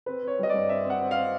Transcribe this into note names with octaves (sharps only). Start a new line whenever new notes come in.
C4 B4
C4 C#5
G3 D#5
G2 D5
C4 E5
C4
F#5
C4
F5
C4